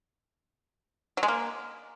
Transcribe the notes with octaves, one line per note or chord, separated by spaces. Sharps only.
F#3
G#3
A#3